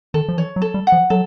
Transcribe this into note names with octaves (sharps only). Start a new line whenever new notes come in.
D#3 A4
F3
E3 C#5
F#3
A4
G3
F#5
F3
F#3 A4